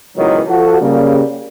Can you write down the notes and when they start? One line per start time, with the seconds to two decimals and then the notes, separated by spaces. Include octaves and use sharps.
0.16 C#2 F#2 B2 D#3 E3 F#3
0.48 F3 F#4 A4
0.81 C#3 G3 A#3